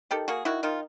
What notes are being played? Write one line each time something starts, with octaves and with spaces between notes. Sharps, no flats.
D#3 G4 A4
A#3 F#4 G#4
D#3 E4 F#4
D#3 D#4 F4